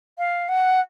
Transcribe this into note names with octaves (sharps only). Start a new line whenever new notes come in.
F5
F#5